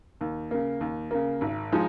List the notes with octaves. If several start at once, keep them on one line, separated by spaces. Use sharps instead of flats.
D#2
C#3 A#3
D#2
C#3 A#3
G#1
F3 G#3 D#4